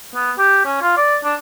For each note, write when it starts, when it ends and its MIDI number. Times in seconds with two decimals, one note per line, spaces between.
0.15 0.32 59
0.38 0.62 67
0.65 0.79 61
0.82 0.97 65
0.97 1.18 74
1.24 1.35 62